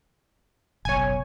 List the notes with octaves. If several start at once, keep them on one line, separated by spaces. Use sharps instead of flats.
F#1 B1 C#5 G#5